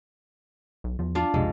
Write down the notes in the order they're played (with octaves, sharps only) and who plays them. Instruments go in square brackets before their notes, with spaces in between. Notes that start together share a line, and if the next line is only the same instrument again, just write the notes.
[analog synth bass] B1
[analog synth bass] E2 [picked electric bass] F3
[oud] D4 [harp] F4
[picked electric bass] B1 F2 [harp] G#2 [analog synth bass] C3